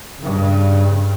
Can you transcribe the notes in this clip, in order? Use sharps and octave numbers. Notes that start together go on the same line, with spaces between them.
G2 C#3